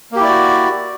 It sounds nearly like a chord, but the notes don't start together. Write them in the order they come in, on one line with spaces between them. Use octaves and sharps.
A#3 G4 E4 D5 F#4